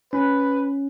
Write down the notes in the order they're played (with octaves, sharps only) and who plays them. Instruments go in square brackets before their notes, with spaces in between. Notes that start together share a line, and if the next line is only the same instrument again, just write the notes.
[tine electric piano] C#4 [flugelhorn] B4